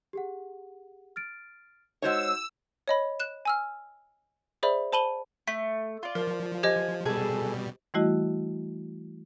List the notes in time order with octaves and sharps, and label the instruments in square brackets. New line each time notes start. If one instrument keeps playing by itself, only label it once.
[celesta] G4 G#4 F#5
F6 A6 D7
[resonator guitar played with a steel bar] G#3 C5 C#5 [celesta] D#4 F#4 F#5 [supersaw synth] E6
[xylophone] C#5 D#5 B5
F#6 E7
G#5 E6 F6
G#4 C5 D5 E5 B5
C5 A5 B5 D#7 F#7 G7
[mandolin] A3 [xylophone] B6
[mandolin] F4 D5
[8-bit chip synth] F3 [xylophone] A#4
[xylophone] G4 C5 D#5 [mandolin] G#5
[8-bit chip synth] B2 G3 [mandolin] G#4 A4
[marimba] E3 G3 A3 E4 F#4 D#5